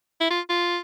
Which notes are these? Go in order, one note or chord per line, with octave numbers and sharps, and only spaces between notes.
E4
F4
F4